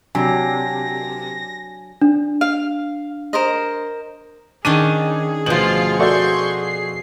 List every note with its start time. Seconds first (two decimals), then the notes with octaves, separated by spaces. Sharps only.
0.15 C3 F#3 D4 G#5 A#6
2.02 D4
2.41 F5
3.33 A#4 C5 D#5
4.65 D#3 C#4 D4 G#4 D#7
5.46 D2 B2 F3 F4 C6 G6 F#7
6.00 F#4 A4 D5 C6 C#6 G6
6.57 C7